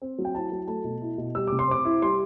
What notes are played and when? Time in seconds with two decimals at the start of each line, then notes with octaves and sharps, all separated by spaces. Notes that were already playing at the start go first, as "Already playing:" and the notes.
0.02 C4
0.18 F#3
0.25 G5
0.35 E4 A5
0.52 F#3
0.68 A3 A5
0.84 B2
1.01 E4
1.18 B2
1.35 G3 E6
1.47 C3 D6
1.59 C6
1.68 C4 D6
1.85 E4
2.02 G3 C6